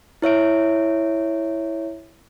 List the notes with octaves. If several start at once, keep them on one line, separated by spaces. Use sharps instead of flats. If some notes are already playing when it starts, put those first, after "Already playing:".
E4 C#5 E5 D7